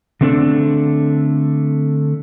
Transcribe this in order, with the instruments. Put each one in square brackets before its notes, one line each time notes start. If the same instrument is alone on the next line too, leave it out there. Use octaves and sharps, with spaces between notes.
[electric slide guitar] D3 A3 C4 D4 A4 D5